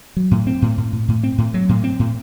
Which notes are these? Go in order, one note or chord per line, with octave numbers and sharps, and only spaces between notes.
F#3
A2
C4
A2
A2
A2
A2
C4
A2
F#3
A2
C4
A2